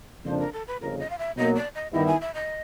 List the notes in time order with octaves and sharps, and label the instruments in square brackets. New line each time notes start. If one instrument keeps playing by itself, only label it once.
[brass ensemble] F2 C#3 F3 A#3 D4 [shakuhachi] C5
[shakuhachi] A#4
A4
B4
[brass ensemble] G1 F2 C#3 [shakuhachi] A#4
[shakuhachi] D#5
F5
E5
[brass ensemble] B1 B2 F#3 A#3 [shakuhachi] D#5
[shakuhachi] D5
D#5
[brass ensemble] G2 D#3 G3 B3 E4 [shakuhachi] D#5
[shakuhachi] G#5
E5
D#5